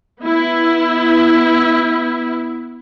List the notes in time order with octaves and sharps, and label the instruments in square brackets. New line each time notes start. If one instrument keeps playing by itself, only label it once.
[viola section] B3 E4